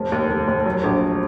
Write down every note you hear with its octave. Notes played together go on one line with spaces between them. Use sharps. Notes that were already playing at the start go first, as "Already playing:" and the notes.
Already playing: F1
D#2
F1
F1
F#3
A#1